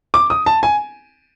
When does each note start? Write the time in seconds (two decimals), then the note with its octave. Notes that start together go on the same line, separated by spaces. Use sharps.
0.14 D6
0.30 D#6
0.46 A5
0.63 G#5